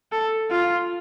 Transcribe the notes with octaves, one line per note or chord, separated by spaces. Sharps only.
A4
F4